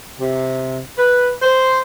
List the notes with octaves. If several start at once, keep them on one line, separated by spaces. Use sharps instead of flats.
C3
B4
C5